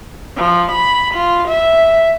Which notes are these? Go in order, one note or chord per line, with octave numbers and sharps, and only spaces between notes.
F3
B5
F4
E5